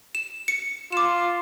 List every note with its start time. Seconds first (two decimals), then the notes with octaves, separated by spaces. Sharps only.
0.15 E7
0.48 C#7
0.92 F4 D6 E7